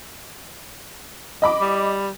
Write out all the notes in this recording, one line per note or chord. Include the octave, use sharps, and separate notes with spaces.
D#5 B5 D6
G3